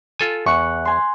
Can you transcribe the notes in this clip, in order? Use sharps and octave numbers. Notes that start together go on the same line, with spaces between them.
F4 A4 G#5
E2 C#6 F#6
G#5 C6